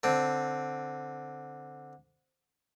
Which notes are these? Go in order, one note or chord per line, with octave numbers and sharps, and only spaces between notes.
D3 C4